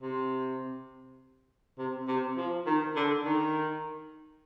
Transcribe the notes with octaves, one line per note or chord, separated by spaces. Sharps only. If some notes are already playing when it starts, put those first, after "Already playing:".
C3
C3
C3
F3
D#3
D3
D#3